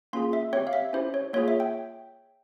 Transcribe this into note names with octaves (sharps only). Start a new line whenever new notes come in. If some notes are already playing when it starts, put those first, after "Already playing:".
A#3 C#4 F4 G#4 C6
E5
C4 G4 C#5
F5
E5
C#4 E4 G4 C5
C#5
A#3 F4 G#4 C#5
E5
G5